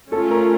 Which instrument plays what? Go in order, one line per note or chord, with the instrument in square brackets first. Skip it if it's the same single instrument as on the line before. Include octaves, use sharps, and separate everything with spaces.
[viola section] A3 C#4 F4 [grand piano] A4
[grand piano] A#4